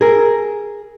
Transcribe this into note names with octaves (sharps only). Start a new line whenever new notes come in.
G#4 A#4